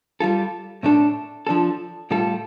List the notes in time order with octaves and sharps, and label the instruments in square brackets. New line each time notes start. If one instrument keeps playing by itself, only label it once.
[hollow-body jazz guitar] G3 F4 A4
A2 A3 D4 A4
F3 D4 A4
A2 G3 F4 A4